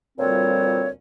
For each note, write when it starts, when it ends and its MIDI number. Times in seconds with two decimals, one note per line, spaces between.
0.18 0.88 38
0.18 0.88 46
0.18 0.88 53
0.18 0.88 55
0.18 0.88 60
0.18 0.88 73